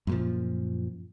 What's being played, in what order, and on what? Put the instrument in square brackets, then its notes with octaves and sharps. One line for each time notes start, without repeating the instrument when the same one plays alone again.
[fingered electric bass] F#2 A#2 F3